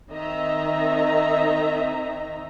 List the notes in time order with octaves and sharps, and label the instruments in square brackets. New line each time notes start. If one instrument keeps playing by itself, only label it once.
[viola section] D#3 C4 D#4 D#5 E5 A#5